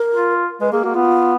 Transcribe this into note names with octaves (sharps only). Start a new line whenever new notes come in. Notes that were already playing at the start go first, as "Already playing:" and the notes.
Already playing: A#4
F4
G#3 B4
A#3 G#4
A#3 F#4
B3 F4